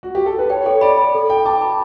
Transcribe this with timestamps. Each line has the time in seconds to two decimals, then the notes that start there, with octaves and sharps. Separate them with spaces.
0.03 F#4
0.15 G4
0.26 A4
0.39 B4
0.50 C#5 G5
0.66 A4 C#5
0.81 D5 B5
0.97 B5
1.14 A4
1.30 A4 G5
1.45 A5 D6
1.62 B5